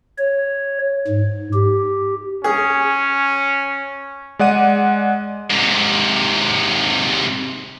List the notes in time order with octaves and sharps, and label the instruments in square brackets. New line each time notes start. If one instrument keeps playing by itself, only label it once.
[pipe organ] C#5
G#2
G4
[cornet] C#4 [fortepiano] G#4
[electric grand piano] G#3 D5 F#5 D#7
[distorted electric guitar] G#2 C3